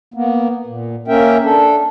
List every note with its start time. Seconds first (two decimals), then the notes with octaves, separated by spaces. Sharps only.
0.14 A#3 B3
0.66 A#2
1.08 A#3 C#4 A#4 E5 G5
1.44 D4 A4